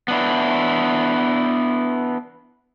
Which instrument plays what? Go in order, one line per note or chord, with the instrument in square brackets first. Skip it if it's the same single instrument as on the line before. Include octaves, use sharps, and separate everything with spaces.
[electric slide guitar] B3 D4 E4